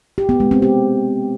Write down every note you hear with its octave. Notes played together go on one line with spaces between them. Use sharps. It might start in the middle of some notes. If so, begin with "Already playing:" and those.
G4
B3
G#3
C4
G4